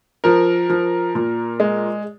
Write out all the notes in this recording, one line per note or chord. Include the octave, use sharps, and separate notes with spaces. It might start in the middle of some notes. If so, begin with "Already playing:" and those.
F3 A#4
F3
A#2
G#3